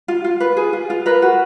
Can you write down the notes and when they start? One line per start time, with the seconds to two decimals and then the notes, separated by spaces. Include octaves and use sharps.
0.08 F4
0.24 F4
0.40 B4
0.57 G#4
0.73 F4
0.90 F4
1.06 A#4 B4
1.22 F#4